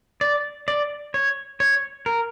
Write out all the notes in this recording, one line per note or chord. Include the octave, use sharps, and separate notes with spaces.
D5
D5
C#5
C#5
A#4